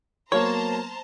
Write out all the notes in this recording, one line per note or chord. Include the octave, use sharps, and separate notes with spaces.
F#3 A#3 B3 C5 C#5 A5 A#5